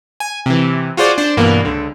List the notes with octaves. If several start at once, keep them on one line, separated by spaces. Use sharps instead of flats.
G#5
C3 E3
F4 F#4 G#4 C5 D5
D4 C5
G2 B2 E3 A#3
C#2 D3